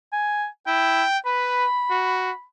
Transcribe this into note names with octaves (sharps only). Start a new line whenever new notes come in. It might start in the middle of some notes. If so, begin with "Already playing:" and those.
G#5
E4 G5
B4 B5
F#4